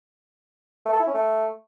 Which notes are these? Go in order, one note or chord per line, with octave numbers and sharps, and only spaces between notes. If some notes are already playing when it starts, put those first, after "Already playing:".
A3
A4
E4
C#4
A3